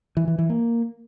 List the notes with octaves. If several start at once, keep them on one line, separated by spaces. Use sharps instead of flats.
E3
E3
E3
A#3